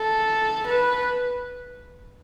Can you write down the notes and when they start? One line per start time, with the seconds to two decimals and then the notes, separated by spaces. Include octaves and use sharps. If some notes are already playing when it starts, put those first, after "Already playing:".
Already playing: A4
0.67 B4